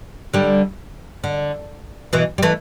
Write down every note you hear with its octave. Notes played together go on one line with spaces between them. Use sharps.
D3 G3
D3
B2 E3
G3
E3 A3